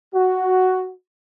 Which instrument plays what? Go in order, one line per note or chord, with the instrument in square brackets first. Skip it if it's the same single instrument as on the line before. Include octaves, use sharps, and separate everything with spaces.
[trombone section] F#4